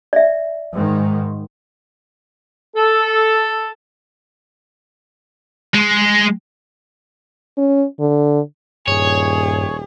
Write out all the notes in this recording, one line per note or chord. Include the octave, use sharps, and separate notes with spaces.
D5 E5
G#2 D#3
A4
G#3
C#4
D3
D#1 G2 G#4 C#5